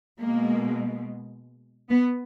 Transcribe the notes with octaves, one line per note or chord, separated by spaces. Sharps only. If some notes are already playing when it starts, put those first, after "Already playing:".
B2 G#3 A#3
B3